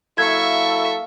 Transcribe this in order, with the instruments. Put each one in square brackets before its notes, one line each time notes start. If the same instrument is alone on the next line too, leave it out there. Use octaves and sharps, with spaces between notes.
[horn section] F#3 E4 A4 [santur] A#3 [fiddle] E5 C#6 [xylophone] G#6